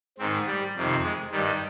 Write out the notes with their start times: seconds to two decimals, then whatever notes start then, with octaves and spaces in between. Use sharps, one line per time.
0.18 G#2 D#3 C4
0.47 G3
0.75 F2 C3 D#3
1.03 G#3
1.32 G2 D#3 G3